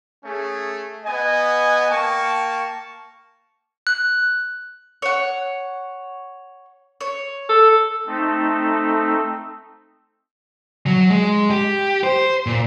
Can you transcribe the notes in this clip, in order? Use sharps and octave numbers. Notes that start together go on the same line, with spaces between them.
A3 C#4 G#4
B3 D#5 G#5
A#3 G5 A5 C#6
F#6
C#5 F#5
C#5
A4
A3 C4 D#4 A4
F#3
G#3
G4
C5
A#2